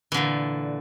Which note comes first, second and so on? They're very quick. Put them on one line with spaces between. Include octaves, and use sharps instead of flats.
E3 D3 A#2